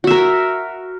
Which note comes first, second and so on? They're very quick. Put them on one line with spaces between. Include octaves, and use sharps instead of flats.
F#4 E5 A#4